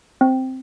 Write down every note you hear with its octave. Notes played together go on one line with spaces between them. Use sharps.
C4